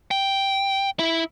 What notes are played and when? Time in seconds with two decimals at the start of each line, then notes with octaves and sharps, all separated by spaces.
0.11 G5
0.99 E4